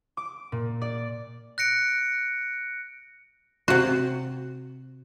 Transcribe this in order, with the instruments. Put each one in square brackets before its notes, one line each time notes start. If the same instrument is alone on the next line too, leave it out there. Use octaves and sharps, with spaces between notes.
[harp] D6
A#2
D5
[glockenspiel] F#6 A#6 C#7 D7
[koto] C3 F#4